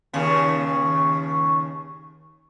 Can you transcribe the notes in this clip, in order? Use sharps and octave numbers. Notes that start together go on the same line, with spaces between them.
D#2 C#3